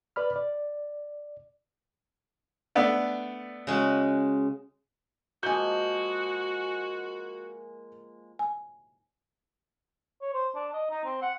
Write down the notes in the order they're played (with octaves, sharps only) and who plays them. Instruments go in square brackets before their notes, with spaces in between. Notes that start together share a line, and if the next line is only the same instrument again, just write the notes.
[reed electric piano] B4 D5 B5 F6
D5
[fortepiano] A3 B3 D4
[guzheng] C#3 G#3 F#4
[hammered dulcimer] F3 G#3 A#3 [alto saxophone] F#4 [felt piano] G#5 G6
[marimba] G#5
[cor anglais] C#5
C5
D4
D#5
D#4
C4
F#5